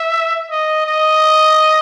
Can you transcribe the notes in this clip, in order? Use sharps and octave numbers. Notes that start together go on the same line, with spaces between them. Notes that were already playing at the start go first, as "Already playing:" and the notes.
Already playing: E5
D#5
D#5